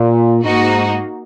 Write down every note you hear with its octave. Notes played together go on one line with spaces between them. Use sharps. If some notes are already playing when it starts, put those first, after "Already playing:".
Already playing: A#2
G#2 A#3 D#4 F#4